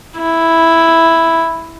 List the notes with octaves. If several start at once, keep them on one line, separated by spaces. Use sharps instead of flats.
E4